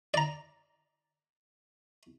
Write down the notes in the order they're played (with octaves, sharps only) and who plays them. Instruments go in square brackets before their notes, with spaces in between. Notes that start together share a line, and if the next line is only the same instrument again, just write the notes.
[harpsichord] D5 A#5